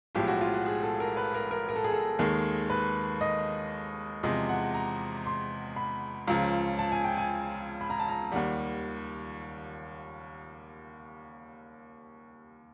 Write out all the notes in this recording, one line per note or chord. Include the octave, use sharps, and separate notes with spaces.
B1 A2 F3 G#3 G4
F#4
F4
F#4
G#4
A4
A#4
B4
A#4
A#4
A#4
A4
G#4
A4
D#2 D#3 G#3
B4
D#5
E2 C3 F3 G#3 D#5
F#5
A#5
C6
B5
C#2 C#3 F3 A#5
A5
G#5
G5
G#5
B5
A#5
A5
A#5
D#2 D#3 G3 F#5